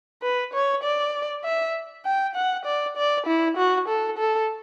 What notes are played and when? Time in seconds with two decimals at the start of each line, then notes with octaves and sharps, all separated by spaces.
0.22 B4
0.53 C#5
0.83 D5
1.45 E5
2.05 G5
2.35 F#5
2.65 D5
2.97 D5
3.26 E4
3.57 F#4
3.88 A4
4.18 A4